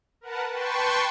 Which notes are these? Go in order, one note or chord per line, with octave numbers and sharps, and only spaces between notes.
A#4 B4 F#5 A5
B4 G5 A5 C6 C#6